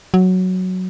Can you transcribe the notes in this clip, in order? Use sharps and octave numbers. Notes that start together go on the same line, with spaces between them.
F#3